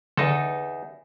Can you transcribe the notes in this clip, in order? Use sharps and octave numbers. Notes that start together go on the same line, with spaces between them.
E2 D3 D#4 A4